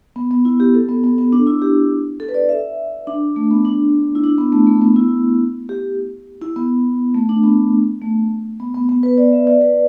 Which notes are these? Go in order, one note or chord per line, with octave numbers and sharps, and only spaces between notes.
B3
B3
E4
G4
A4
B3
B3
B3
D4
E4
G4
A4
B4
D5
E5
D4
A3
B3
D4
E4
D4
B3
A3
A3
B3
E4
G4
E4
B3
A3
D4
B3
A3
B3
B3
B3
B4
D5
E5
D5
B4